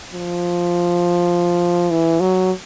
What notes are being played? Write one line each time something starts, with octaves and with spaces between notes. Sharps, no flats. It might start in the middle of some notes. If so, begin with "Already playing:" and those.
F3
E3
F#3